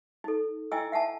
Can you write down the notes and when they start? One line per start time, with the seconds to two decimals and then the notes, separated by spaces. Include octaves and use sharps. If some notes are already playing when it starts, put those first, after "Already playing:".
0.24 D#4 A4
0.72 E4 D#5 G5 G#5 E6
0.92 E5 F#5 G#5 A5